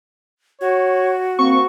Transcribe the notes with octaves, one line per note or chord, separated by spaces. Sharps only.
F#4 C#5
A#3 C4 C#6